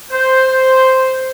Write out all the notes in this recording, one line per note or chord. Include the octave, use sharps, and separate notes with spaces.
C5